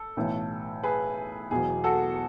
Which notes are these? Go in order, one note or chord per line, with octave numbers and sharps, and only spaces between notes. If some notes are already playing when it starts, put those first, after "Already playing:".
Already playing: A4
B1 A2 E3
G#4 B4
E1 E2 B2 F#3 G#4
F#4 A4